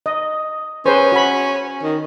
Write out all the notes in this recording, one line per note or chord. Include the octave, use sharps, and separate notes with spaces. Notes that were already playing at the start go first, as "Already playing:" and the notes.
D#5
C#4 G#4 B4 C5
F#4 C#5 B5
D#3